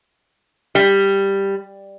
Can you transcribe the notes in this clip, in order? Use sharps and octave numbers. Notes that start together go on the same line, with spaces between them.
G3